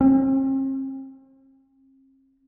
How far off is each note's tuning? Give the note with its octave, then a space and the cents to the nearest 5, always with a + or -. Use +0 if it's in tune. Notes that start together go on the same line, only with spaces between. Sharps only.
C4 +40